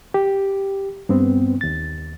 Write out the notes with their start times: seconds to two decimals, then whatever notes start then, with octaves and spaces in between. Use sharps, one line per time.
0.14 G4
1.09 G2 B3 C4
1.61 D#2 A6